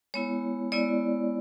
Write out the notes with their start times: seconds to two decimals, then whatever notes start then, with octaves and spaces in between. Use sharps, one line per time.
0.14 G#3 B3 E4 C#5
0.72 G#3 B3 E4 D5